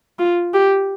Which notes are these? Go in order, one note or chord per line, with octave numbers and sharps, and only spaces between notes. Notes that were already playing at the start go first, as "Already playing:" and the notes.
F4
G4